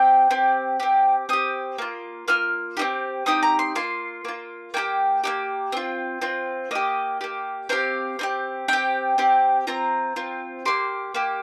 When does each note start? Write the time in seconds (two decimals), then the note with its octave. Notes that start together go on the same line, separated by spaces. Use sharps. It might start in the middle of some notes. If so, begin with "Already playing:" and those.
Already playing: C4 G4 G5
0.31 C4 G4
0.80 C4 G4
1.29 C4 G4 D#6
1.78 A#3 F4
2.28 A#3 F4 F6
2.77 C4 D#4 G4
3.26 C4 D#4 G4 D#6
3.43 A#5
3.59 C6
3.75 A#3 F4 C6
4.25 A#3 F4
4.74 A#3 D#4 G4 G5
5.24 A#3 D#4 G4
5.72 C4 F4
6.22 C4 F4
6.71 A#3 G4 D#5
7.21 A#3 G4
7.69 C4 D#4 G4 F5
8.19 C4 D#4 G4
8.68 C4 G4 G5
9.18 C4 G4
9.67 C4 F4 A#5
10.16 C4 F4
10.65 A#3 G4 C6
11.14 A#3 G4